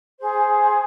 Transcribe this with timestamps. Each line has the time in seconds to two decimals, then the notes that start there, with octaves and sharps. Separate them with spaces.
0.20 G#4 C5